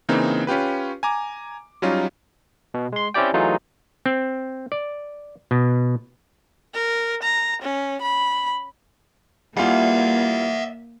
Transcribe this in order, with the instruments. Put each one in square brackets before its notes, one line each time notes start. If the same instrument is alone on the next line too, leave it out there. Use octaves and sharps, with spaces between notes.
[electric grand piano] C#3 E3 A#3 C4 D#4
C#4 F4 G4 B4
G#5 A#5 D6
F#3 G3 C#4 D#4 F4
[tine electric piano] B2
G#3 C6
C4 C#4 E4 G4 D5 G5
E3 F#3 A3 D#4 F4 G#4
[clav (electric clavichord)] C4
D5
B2
[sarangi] A#4
A#5
C#4
B5
[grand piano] G3 E4 F4 [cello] A#3 [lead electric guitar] E5 F#5